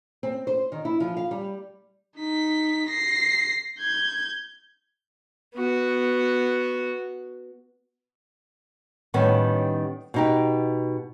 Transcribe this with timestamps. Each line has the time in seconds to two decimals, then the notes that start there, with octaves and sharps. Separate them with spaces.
0.23 C4
0.47 C5
0.72 D#3
0.85 E4
1.00 F3
1.17 F5
1.31 G3
2.18 D#4 B6
2.90 A#6 C7
3.79 G6 G#6
5.55 B3 F#4
9.14 A2 D#3 G3 B3 C#4
10.14 B2 D#4 G4